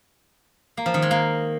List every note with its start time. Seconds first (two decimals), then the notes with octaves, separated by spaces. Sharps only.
0.77 A#3
0.86 F3
0.94 D#3
1.02 G#3
1.11 A#3